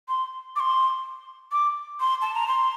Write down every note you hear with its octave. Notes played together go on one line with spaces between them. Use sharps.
C6
D6
C6
D6
C6
A5
A#5
C6